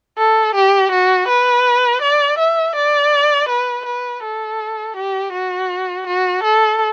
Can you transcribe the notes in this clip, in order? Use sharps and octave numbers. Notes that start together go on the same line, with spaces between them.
A4
G4
F#4
B4
D5
E5
D5
B4
B4
A4
G4
F#4
F#4
A4